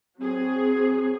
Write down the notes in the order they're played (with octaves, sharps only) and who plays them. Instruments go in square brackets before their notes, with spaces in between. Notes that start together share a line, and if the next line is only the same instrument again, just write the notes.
[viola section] F#3 G#4 [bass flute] C4